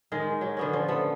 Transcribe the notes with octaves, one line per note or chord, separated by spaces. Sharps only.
D#3 G#3 A#4
F#3
D3 B3 C#4
F3
A3 B3